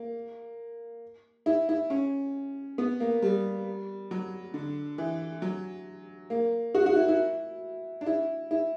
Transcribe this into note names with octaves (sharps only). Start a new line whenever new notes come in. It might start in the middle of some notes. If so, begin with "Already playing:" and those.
Already playing: A#3
E4
E4
C#4
B3
A#3
G3
F#3
D3
E3
F#3
A#3
F#4
F#4
E4
E4
D4
E4
E4